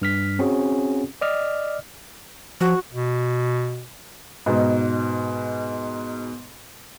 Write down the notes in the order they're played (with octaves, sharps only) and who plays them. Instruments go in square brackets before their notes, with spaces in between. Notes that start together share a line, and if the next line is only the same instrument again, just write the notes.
[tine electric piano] G2 F6 B6
C4 C#4 F#4 G#4
D5 D#5 F6
[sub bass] F3 [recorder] F#4
[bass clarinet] B2
[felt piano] G#2 B2 D#4